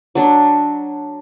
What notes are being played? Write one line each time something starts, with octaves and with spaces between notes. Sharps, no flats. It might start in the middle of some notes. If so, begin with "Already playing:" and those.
F#3 D4